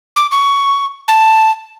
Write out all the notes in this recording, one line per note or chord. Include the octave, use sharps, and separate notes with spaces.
D6
C#6
A5